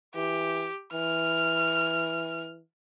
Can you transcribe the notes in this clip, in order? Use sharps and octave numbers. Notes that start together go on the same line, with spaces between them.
E3 G4
E3 F6